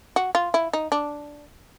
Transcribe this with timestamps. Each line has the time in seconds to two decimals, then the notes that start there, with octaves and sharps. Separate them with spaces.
0.16 F#4
0.35 F4
0.54 E4
0.73 D#4
0.92 D4